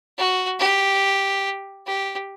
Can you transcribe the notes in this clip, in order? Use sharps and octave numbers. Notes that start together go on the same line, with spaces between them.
F#4
G4
G4